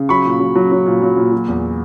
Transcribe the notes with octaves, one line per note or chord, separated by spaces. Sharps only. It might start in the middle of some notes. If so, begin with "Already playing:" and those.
Already playing: C#3
F#3 B5 C#6
A#2
F#3
F#3
F#3
A#2
F#3
A#2
F#3
E2